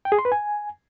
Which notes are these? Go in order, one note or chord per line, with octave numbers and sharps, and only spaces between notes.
G5
G#4
C6
B4
G#5